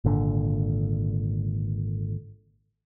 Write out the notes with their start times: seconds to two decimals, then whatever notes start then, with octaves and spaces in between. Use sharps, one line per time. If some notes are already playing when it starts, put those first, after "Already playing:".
0.05 G#1 A#2 D3